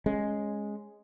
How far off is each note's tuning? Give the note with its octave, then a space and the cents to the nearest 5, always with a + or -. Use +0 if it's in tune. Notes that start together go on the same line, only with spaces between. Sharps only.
G#3 +0 C#4 -10